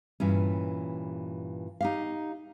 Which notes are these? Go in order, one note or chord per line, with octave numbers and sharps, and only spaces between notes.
G2 A#2 E3 C#4
D#4 G4 F5